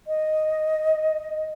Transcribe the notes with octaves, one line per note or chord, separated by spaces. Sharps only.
D#5